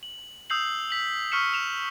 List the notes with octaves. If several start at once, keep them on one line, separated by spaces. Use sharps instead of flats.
F#7
D#6 E6 G6 C7 F#7
E6 B6 F#7
C#6 F6 B6 C#7 E7
E7 F7